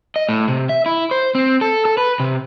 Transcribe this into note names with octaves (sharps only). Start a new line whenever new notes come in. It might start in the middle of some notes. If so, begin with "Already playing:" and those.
D#5
A2
C3
E5
E4
C5
C4
A4
A4
B4
C3